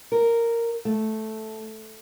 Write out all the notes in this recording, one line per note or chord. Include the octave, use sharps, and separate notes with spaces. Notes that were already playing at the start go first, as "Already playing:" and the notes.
A#4
A3